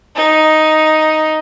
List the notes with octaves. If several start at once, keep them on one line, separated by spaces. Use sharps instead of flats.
D#4